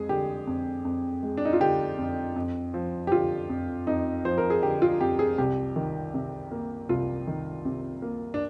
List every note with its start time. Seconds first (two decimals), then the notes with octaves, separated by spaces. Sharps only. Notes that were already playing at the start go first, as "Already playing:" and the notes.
Already playing: F2 G#3 G#4
0.09 D3 G4
0.47 F2
0.85 F2
1.23 G#3
1.37 D4
1.45 D#4
1.53 F4
1.60 D3 G4
1.98 F2
2.36 F2
2.74 F3
3.07 G4
3.12 D3 F4
3.49 F2
3.87 F2 D#4
4.25 F3 C5
4.38 A#4
4.50 G#4
4.63 D3 G4
4.82 F4
5.01 F2 G4
5.19 G#4
5.38 C2 G4
5.76 D#3
6.14 C3
6.52 A#3
6.89 C2 F4
7.27 D#3
7.65 C3
8.02 A#3
8.34 D4